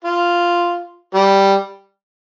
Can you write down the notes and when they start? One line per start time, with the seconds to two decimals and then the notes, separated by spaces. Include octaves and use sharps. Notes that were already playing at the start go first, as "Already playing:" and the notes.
0.04 F4
1.15 G3